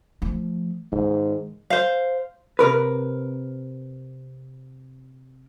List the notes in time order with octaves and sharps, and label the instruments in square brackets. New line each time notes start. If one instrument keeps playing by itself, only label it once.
[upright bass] F3 A3
[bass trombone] G#2 [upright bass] D#3
[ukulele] C5 F5
[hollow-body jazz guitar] C3 A#4 B4